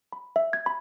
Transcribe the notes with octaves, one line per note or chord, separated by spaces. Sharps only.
B5
E5
G#6
B5